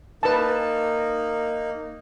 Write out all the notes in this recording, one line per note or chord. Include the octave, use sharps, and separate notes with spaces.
A#3 D#4 B4 A5